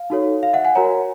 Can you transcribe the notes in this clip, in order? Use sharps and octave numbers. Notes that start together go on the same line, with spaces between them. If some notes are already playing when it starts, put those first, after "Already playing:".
Already playing: F5
D#4 F#4 A4 C#5
F5
E5 F#5
F#5 G#5
F#4 A#4 C#5 G#5 A#5